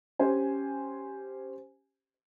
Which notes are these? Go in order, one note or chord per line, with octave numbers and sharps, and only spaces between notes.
C#4 G4 C5 G#5